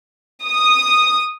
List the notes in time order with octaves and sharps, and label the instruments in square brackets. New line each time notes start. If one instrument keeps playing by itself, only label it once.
[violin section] D#6